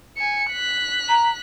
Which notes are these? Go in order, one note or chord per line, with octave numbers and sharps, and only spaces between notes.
G#5 C#7
F#6 B6
A#5